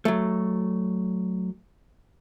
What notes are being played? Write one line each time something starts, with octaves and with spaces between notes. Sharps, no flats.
F#3 A3